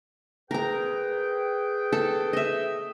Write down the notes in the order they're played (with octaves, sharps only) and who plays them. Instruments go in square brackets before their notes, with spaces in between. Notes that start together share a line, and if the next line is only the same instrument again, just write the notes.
[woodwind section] G#4 B4 G5 [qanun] A#4 A#5
[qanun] A4
D#5 E5